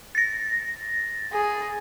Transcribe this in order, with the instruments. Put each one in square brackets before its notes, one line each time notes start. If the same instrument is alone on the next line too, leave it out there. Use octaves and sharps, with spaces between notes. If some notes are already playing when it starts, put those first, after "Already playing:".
[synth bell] A6 A#6
[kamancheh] G#4